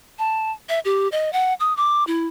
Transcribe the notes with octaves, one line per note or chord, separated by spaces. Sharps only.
A5
E5
G4
D#5
F#5
D#6
D6
E4